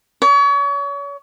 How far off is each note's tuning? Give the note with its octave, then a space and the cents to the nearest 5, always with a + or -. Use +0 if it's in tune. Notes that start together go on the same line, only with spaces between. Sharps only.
C#5 +35